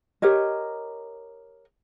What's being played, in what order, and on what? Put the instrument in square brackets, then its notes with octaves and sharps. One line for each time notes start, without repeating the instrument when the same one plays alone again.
[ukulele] G4 A#4 C#5 D#5